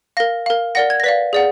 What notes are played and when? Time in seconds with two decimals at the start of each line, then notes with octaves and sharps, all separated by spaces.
0.17 A#4 F5 A#6
0.46 A#4 F5
0.75 A#4 D5 F#5 A#6
0.90 G#6
1.00 A#6
1.03 B4 D5 F5 B6
1.33 G#4 D5 F#5